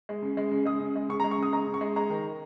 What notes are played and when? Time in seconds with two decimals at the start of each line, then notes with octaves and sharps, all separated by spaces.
0.09 G#3
0.22 C#3
0.37 G#3
0.51 C#3
0.66 G#3 D#6
0.80 C#3
0.96 G#3
1.09 C#3 C#6
1.20 A#5
1.24 G#3
1.31 C#6
1.38 C#3 D#6
1.53 G#3 A#5
1.67 C#3
1.74 C#6
1.81 G#3
1.96 G#3 A#5
2.10 D#3